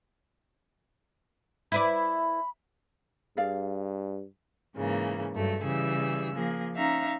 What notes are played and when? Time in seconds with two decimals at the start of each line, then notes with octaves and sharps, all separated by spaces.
1.72 E4 B4 D5 B5
3.37 G2 G#4 D5 F5
4.76 G#2 C#3 E3 A#3
5.33 G2 F#3 A3
5.63 C#3 E3 G3 G#4 E6
6.34 F3 A#3 G#4
6.75 C#4 D#4 E5 F5 A#5